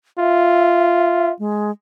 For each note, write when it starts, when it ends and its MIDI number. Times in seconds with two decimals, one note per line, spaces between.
0.19 1.33 65
0.19 1.32 76
1.39 1.71 56